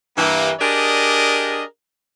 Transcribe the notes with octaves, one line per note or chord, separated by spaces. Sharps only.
G2 E3 A#3
D4 G4 G#4 A#4 D5 D#5